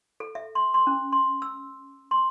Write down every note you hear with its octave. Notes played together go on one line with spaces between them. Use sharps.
A4
E5
C6
C6
C#4
C6
E6
C6